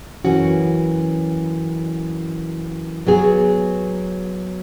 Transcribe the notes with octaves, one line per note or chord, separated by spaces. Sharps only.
F#2 E3 C#4 F#4
F#3 B3 G#4